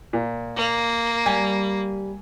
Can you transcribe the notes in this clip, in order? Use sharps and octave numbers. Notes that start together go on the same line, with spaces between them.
A#2
A#3
G3 G#5